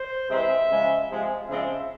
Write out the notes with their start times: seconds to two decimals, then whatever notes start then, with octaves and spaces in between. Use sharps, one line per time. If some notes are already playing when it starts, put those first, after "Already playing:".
Already playing: C5
0.30 C3 E3 G#3 C4 E5
0.70 C#3 F3 G#3
1.10 C3 F3 G#3
1.48 C#3 F3 G#3 C4 E5